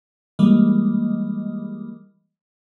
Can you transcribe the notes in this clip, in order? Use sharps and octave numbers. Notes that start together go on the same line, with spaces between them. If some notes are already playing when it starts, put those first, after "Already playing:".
E3 G3 G#3 A#3 D#5